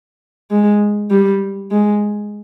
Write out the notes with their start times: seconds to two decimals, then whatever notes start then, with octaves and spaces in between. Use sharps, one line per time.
0.51 G#3
1.11 G3
1.71 G#3